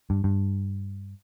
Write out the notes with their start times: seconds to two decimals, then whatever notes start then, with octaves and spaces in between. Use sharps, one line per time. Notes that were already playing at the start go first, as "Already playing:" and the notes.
0.10 G2
0.24 G2